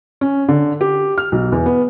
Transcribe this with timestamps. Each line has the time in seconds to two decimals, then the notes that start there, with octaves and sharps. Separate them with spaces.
0.21 C#4
0.49 D3
0.81 G4
1.18 F6
1.32 B1
1.52 E2
1.66 B3